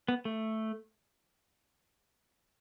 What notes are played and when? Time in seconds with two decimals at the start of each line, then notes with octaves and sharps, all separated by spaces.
0.08 B3
0.25 A3